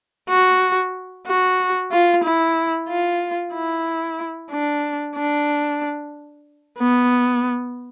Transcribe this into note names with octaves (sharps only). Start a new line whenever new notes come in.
F#4
F#4
F4
E4
F4
E4
D4
D4
B3